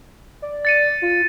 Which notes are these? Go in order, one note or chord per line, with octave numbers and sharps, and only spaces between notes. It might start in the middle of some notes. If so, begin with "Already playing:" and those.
D5
A6 C#7 D#7
F4